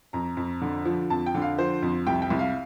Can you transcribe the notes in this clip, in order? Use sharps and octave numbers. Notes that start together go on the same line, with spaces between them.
F2 A#5
F2
D3
F3
F2 A5
G5
D3
F5
F3 C5
F2
C2 G5
G5
C2
F5